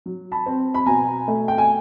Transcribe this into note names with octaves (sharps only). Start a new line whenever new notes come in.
F#3
A5 B5
C4
B5
B2 G#5 A#5
A3
G5
G#5